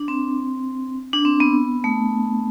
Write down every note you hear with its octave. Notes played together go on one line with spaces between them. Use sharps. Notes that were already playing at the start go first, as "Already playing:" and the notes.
Already playing: D4
C4
D4
C4
B3
A3